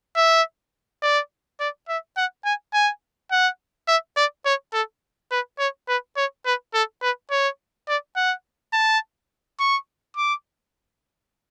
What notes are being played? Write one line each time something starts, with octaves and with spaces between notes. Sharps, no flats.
E5
D5
D5
E5
F#5
G#5
G#5
F#5
E5
D5
C#5
A4
B4
C#5
B4
C#5
B4
A4
B4
C#5
D5
F#5
A5
C#6
D6